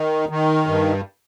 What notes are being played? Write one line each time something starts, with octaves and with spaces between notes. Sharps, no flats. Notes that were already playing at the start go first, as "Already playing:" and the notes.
Already playing: D#3
D#3
G2